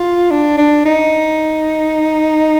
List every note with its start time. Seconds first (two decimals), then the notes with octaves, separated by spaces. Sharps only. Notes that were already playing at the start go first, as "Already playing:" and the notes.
Already playing: F4
0.31 D4
0.58 D4
0.85 D#4